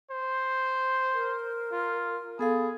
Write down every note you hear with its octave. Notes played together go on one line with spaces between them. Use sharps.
C5
A#4
F4
B3 G#4 A4 F5